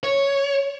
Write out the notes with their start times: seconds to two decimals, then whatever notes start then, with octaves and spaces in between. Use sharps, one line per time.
0.03 C#5